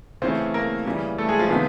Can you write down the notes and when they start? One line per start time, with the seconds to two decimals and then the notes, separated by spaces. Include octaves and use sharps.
0.22 C#3 E3 A3 C4 C5
0.54 A#3 A#4
0.85 C#3 E3 G3 A#3
1.18 A3 A4
1.28 G#3 G#4
1.39 F3 F4
1.50 C3 D#3 F3 G#3 B3 F4